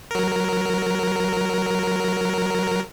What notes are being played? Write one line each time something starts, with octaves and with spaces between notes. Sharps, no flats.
F#3 A#4